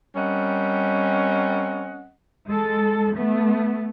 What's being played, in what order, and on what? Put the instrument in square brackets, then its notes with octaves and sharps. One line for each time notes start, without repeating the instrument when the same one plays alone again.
[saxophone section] G3 C4 C#4 A#4 D#5 F#5
[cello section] G#3 A4
A3 B3